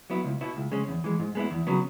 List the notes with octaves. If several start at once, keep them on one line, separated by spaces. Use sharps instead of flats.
F#3 B3 E4
C#2
B2 B3 E4
C#2
C#3 G#3 C#4
E2
E3 G#3
G#2
G#3 B3 E4
E2
C#3 F#3 B3